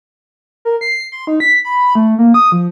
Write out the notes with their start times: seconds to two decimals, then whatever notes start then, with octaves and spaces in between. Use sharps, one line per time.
0.65 A#4
0.81 C7
1.12 C6
1.27 D#4
1.40 B6
1.65 B5
1.95 A3
2.19 A#3
2.34 D#6
2.52 F3